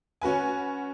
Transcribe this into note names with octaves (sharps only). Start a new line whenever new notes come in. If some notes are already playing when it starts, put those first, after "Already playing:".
C#4 F#4 B4 G#5